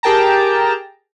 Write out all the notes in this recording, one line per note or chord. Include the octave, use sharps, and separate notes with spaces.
G4 G#4 A#4 G5 A5 A#5